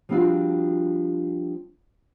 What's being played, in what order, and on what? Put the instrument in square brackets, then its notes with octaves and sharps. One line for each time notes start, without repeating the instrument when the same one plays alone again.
[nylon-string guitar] F3 G3 C4 D4 F4 F#4